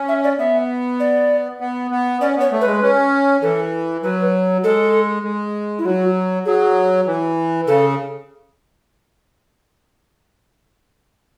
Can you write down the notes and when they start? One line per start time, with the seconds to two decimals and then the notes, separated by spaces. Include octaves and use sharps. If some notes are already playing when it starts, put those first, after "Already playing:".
Already playing: C#4
0.08 E5
0.24 D5
0.39 B3 E5
1.00 D5
1.60 B3
1.91 B3
2.21 C#4 D5
2.36 B3 C#5
2.52 A3
2.61 B4
2.67 G#3
2.82 C#4
3.42 E3 A4
4.03 F#3 B4
4.64 G#3 A4
5.24 G#3
5.79 E4
5.85 F#3 F#4
6.45 F#3 G#4
7.06 E3
7.67 C#3 A4